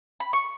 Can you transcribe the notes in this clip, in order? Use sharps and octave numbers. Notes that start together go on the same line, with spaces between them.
B5
C#6